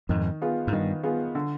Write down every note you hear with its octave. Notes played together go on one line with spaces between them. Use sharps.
F2 G#2 D#3
B3 F4 G#4
G#2
G2 D#3
B3 F4 G#4
D3